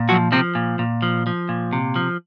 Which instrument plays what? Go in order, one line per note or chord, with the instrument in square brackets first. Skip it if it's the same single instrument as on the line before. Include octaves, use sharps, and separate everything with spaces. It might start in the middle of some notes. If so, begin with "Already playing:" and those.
Already playing: [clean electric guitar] A#2
F3 F#3 F#4
C3 F3 C4
A#2
A#2
F3
F3
A#2
C3
F3